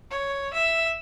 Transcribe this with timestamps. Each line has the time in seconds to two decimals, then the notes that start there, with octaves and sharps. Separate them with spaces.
0.11 C#5
0.54 E5